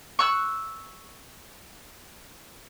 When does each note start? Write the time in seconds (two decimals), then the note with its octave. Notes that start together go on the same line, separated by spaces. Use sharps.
0.19 C#6 E6 F#6